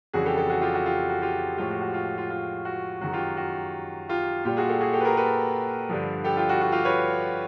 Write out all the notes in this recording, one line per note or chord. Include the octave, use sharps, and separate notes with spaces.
F2 C#3 E3 G3 F#4 G#4
G4 A4
G4 A4
F#4 G#4
F4 G4
F#4
F4 G4
F#4
F4 G4
A2 F3 G#3 F4 G4
F#4
F#4
F4
F4
F4
F#4
F#2 D#3 G#3 F#4
F4 G4
F#4
F4 G4
A#2 G3 F4 G4
F#4 G#4
G4 A4
F#4 G#4
G4 A4
B4
G#4 A#4
A4 B4
G2 D3 F3
G4 A4
F4 G4
F#4
F#4
F4 G4
B4 C#5